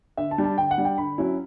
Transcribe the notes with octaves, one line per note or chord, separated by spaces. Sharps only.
D3 E5
A5
G3 D4
A5
D3 G5
F#5
G3 D4
G5
D3 B5
F#3 C#4 E4